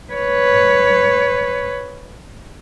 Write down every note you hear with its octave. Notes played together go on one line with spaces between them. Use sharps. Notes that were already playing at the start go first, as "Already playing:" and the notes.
B4 C#5